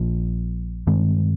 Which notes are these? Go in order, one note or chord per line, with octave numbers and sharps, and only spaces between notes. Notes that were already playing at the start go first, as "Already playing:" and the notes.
Already playing: A#1 A#2 F3
G2 D#3 G#3 C4